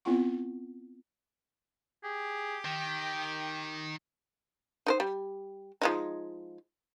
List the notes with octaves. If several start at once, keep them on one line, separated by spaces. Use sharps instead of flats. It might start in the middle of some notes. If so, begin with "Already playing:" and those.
B3 C4 E4 F4 F#5 C#6
G4 G#4
D#3 G5
D#4 A#4 C5
G3
F3 G#3 D#4